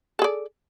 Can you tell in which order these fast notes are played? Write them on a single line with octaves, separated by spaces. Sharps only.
A4 G#4 D5